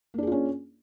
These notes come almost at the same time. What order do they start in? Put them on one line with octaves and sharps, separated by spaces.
A#3 D4 G#4 F4 C#4